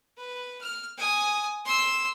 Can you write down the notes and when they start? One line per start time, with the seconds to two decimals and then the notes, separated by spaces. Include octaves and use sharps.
0.17 B4
0.61 F6
0.98 G#5 D#6
1.65 C6 E6